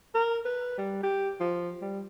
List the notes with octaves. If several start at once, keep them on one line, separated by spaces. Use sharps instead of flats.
A#4
B4
G3
G4
F3
G3